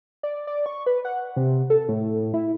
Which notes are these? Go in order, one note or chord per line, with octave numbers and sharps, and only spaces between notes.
D5
D5
C#6
B4
F#5
C3
A4
A2
E4